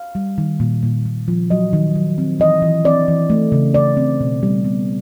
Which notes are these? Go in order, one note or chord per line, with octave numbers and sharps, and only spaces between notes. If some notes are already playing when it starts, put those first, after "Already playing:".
Already playing: F5
G3
D#3
A#2
A#2
A#2
F3
F#3 D#5
D#3
F#3
C4
E3 D#5
E3
C4 D5
E3
A3
C#3
C#3 D5
C4
B2
G3
B3